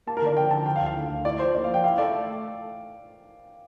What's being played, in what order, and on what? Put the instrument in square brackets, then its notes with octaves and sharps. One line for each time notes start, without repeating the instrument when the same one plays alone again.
[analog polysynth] A#3 [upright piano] A5
[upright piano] A#4
[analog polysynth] D3 [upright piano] D5
[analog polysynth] F3 [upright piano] G5
[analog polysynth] D3 [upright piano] A5
[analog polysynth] F3 [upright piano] G5
[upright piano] F5
[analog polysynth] D2
[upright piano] F5
[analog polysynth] D3
D2
[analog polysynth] E4 [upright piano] D5
[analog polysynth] F3 [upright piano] C5
[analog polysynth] A#3 [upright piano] D5
[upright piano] F5
[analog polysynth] F3
[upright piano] G5
[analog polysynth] E4 [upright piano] F5
[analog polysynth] A4 [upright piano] D5
[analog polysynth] A3